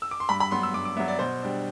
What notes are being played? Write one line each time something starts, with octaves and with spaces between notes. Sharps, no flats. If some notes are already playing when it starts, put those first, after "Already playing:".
E6
D6
C6
G2 B5
B5
F#3 B3 C6
E6
G2 D6
D6
F#3 B3 E5
D5
B2 C5
G3 D4